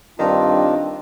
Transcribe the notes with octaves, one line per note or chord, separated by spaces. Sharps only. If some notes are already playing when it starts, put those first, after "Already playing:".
G2 D#3 C4 D4 F4